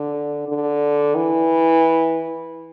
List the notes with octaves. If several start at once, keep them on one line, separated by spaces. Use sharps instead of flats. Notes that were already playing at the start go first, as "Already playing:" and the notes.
Already playing: D3
D3
E3